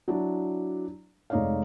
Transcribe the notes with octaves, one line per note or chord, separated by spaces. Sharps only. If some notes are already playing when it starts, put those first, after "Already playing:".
F#3 D4 E4 D5
F1 G#3 D#4 C#5 D5 F5